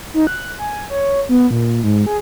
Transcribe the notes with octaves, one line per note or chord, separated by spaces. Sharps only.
D#4
F#6
G#5
C#5
B3
A#2
G#2
G#4